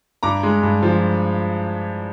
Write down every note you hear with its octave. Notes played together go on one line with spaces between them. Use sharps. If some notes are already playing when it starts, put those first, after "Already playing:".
G2 A#5 D6
G#3
G2
F3